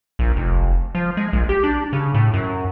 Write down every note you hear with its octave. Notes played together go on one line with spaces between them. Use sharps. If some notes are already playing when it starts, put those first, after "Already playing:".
A#1
F1
F3
G#3
A#1
G4
D4
C#3
A2
F#2